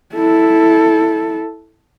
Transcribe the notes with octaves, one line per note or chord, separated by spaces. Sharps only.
E4 A4